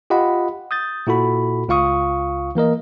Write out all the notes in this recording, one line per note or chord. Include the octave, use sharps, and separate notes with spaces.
F4 G4 D#5 F#5 B5
D#6 G6 A6
A#2 E4 F#4 A4 B5
C#2 F4 F5 C#6 D#6
E3 A#3 A#4 D#5